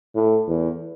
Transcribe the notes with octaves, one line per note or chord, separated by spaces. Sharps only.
A2
E2